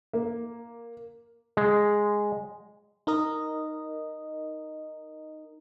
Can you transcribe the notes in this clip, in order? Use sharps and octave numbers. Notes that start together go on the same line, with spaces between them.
A#3
G#3
D#4 A#4 D#5